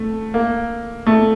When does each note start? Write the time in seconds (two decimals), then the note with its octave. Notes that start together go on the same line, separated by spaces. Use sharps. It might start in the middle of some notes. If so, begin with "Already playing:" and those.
Already playing: A3
0.34 A#3
1.07 A3